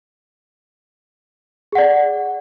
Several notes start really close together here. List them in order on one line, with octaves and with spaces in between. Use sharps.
G#4 F#5 D5